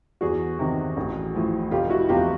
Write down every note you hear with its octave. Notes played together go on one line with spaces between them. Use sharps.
E2 F#4 G#4
C3 D#3
A1
A2 F3
F1 F4 G4
E4 F#4
E2 C3 F3 F4 G4